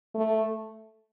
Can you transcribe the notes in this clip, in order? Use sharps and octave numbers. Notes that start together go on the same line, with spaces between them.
A3